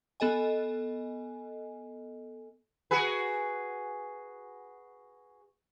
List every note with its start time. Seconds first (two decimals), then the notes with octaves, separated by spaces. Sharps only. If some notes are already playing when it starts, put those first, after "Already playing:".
0.20 B3 A4 D#5 G#5
2.91 F#4 G#4 B4